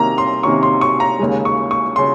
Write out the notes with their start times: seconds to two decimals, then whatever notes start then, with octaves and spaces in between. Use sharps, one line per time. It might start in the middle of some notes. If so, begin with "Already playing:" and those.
Already playing: C3 D#3 A#3 A#5
0.18 C6
0.43 C3 D#3 A#3 C#4 C#6
0.63 C6
0.81 C#6
1.00 A#5
1.19 D#2 C#3 G#3
1.45 C#6
1.71 C#6
1.96 C#3 C6